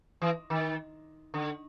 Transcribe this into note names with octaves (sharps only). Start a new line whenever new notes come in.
E3
D#3
D3